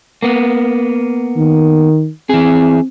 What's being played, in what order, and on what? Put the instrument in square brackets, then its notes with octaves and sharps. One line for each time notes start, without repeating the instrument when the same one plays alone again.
[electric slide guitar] A#3 B3
[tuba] D#3
[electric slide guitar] E3 G#4 [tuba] C4